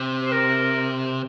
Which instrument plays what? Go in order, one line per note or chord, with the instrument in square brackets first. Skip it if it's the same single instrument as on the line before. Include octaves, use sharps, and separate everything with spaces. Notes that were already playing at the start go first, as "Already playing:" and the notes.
Already playing: [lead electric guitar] C3
[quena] C5
A#4